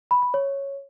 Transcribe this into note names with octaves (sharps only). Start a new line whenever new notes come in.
B5
B5
C#5